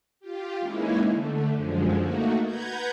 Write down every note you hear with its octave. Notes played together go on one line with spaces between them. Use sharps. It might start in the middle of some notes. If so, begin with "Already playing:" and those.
F4 G4
E3 G#3 A#3 C#4 D#4 E4
D3 A3
F#2 D3 F3 G#3
A3 A#3 D#4 F#4
B4 F#5 A#5 G6 G#6